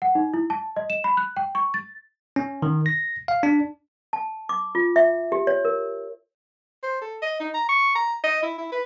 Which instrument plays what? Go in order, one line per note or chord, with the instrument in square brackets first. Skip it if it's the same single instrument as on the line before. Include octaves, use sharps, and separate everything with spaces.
[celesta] F#5
D#4
E4
A5
D#5
E7
B5
F#6
G5
C#6
A6
[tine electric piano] C#4
D#3
A#6
F5
D4
[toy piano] A5
D6
F4
E5
G4
C#5
A#4
[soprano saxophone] C5
A4
D#5
D#4
A#5
C#6
A#5
D#5
E4
E4
B4